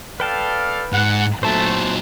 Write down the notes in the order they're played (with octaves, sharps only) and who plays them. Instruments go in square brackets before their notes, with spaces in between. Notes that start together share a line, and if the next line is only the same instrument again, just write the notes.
[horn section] A4 D5 F5 [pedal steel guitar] B4 G5 A5
[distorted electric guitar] G#2 [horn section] F#5
[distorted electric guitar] A#2 F#3 [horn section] A3 [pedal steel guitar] C5 A5